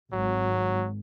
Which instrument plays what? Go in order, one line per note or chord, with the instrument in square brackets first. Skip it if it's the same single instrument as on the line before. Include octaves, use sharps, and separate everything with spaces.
[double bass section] G#1 [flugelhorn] F#3